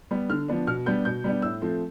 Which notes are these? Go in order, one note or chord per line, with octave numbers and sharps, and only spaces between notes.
G3 B3
D3 F6
F3 B3 D4
B2 F6
G3 B3 D4 G6
B2 G6
G3 B3 D4
A2 E6
F3 A3 C4